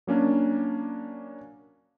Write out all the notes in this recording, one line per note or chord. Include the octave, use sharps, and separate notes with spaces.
F#3 A#3 C#4 D4